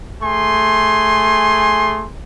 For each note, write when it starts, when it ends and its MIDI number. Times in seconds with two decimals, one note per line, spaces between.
0.23 2.07 57
0.23 2.07 68
0.23 2.07 80
0.23 2.07 84